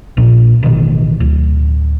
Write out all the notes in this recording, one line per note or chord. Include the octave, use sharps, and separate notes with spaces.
A#1 A#2
A1 B2 D#3
D1